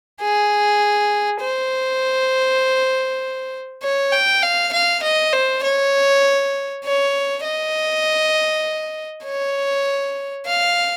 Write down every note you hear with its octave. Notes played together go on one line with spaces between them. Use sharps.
G#4
C5
C#5
G5
F5
F5
D#5
C5
C#5
C#5
D#5
C#5
F5